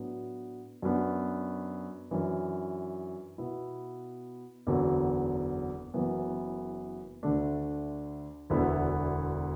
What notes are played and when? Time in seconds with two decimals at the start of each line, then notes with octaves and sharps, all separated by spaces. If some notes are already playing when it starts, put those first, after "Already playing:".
Already playing: A2 F#3 B3 D4
0.82 F#2 F#3 B3 D4 F#4
2.10 F#2 E3 D4
3.38 B2 B3 E4
4.67 F#1 E2 D3 F#3
5.94 F#1 F#2 E3 B3
7.23 D2 D3 A3 D4
8.50 E1 D2 D3 B3 E4